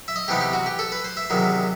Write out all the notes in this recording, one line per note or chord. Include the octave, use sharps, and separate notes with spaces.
E5
D#5
C3 E3 B3 D#4 G4
G4
F#4
G4
A4
B4
C5
E5
E2 C3 D#3 F#3